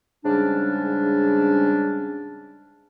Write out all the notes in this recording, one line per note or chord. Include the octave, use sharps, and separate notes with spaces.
G#2 C#3 G3 C#4 D4